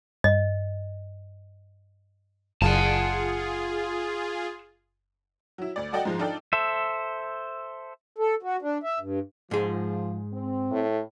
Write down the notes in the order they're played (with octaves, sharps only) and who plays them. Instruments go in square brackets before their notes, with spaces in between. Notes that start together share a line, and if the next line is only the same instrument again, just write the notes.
[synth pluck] G2 [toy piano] D#5
[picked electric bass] F#1 [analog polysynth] F4 G#4 [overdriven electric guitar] F#5 A5
[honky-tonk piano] F#3 E4
D2 D5
F#4 A4 D5 D#5 F#5 G5
G#2 F3 G#3
D4 D#4 F4 A4 D5 G5
[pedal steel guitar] A4 C5 E5
[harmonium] A4
F#4
D4
E5
G2
[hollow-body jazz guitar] G#2 G#4 [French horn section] F3
[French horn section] C4
[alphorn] A2